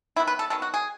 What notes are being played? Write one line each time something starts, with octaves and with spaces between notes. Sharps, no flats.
D#3 F#3 B3 E4
B4
A4
D#3 F#3 B3 A4
F#4
G#4